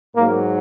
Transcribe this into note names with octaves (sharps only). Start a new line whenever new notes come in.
G#2 F#3 A#3